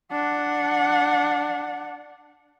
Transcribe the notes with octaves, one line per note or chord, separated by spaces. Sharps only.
D4 F#5